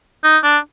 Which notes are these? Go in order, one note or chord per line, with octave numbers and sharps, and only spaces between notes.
D#4
D4